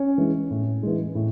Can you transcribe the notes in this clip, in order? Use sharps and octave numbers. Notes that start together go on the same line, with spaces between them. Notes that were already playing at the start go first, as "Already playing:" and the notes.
Already playing: C#4 C#5
E3 G#3
A2
E3 G#3
A2